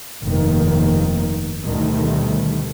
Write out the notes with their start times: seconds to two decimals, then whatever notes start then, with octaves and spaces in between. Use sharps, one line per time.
0.23 F1 G2 D#3 A#3
1.64 D2 B2 D#3 G3 A3